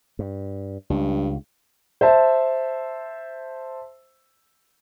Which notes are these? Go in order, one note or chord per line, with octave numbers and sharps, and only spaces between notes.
G2
C#2 G2
C5 E5 A5